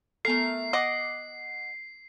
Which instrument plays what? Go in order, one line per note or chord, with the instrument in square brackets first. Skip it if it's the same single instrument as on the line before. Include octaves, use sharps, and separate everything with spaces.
[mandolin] A3 A#4 [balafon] B3 A4 [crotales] C7
[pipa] D#5 [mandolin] F#5 D6